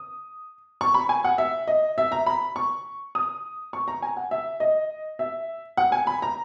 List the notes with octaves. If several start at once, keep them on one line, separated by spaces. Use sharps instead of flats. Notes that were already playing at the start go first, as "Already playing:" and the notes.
Already playing: D#6
C#6
B5
G#5
F#5
E5
D#5
E5
A#5
B5
C#6
D#6
C#6
A#5
G#5
F#5
E5
D#5
E5
F#5
G#5
B5
A#5